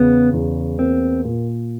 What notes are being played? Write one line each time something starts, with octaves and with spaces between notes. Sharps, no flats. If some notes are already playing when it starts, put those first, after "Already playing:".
Already playing: E2 C#3 B3
E2
A#3 C4
A#2